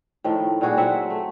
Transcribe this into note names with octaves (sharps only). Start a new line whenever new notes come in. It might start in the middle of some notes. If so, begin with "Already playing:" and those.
A2 D#3 F3 A3
A#2 G3 F#4 G#4
F#3 C4 E5 F#5
A3